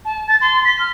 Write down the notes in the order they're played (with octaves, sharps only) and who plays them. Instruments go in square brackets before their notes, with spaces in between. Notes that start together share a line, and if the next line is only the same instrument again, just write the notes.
[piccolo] A5
A6
C6
B6
F6